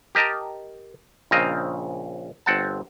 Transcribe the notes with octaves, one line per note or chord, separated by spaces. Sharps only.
G4 A#4 D#5 A5 A#5
A#1 C#3 C4 D#5 F5 A#5
G1 C4 F#5 A5